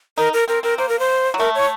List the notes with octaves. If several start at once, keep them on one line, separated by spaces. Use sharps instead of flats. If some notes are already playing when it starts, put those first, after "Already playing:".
D#4 A#4
A#4
C4 A#4
C4 A#4
A#3 C5
A#4
C5
F#3
A3 A#4
C#5